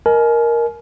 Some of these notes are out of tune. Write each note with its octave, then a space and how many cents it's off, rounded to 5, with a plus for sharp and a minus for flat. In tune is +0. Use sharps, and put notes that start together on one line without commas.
A#4 +5 D#5 +0 G#5 +40